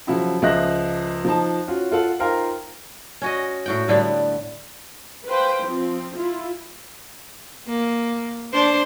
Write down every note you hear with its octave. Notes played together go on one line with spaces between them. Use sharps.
C#3 F3 F#3 E4 F#4
C#2 F3 D#5 E5 F#6 A#6
F3 D#4 A5
C#4 F4 F#4
F4 A4 F#5
D#4 F4 A#4 C5 F5 G5
C#4 F#4 D#5
A2 F#4 G5
A2 D3 G3 B3
B4 C5 F5 G5
F3 C4
E4 F4
A#3
D4 C5